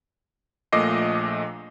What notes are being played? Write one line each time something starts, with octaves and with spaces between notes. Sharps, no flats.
A#1 A#2 A3 D#5 D6 C7